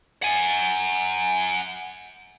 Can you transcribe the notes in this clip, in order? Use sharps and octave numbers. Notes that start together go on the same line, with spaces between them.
F#5 G#5